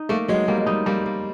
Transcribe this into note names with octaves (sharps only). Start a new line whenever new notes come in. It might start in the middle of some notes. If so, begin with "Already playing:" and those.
Already playing: D#4
A3 A#3
F#3 G#3
G3 A#3
G#3
G3 D#4
G3 A#3
A#3